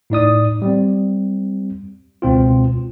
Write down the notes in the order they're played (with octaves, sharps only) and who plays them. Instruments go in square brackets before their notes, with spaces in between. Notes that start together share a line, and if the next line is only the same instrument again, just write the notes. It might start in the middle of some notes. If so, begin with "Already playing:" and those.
[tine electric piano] A2 D#4 D5 D#6
G3 C4
C#2 B2 C4 F4